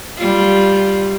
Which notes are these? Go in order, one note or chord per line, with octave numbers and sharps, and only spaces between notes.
G3 F4